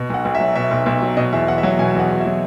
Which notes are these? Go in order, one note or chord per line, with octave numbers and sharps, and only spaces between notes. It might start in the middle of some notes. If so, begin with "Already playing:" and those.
Already playing: B2
B1 F#5
B1
E5
F#3
B2 E5
B1
B1
F#3
B2 D#5
E2 E5
E2 F#5
E5
F#3 F#5
B2 G#5
E2 F#5
E2
E5
F#3